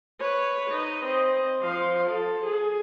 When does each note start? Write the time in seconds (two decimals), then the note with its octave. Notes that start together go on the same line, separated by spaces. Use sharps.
0.20 B4 C#5
0.70 D#4 B4
1.05 C4 D#5
1.61 F3 F5
2.10 A4
2.46 G#4